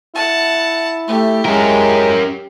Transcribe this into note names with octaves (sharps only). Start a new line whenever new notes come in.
E4 F#5 A5
A3 G4
G#3 C#4 A#4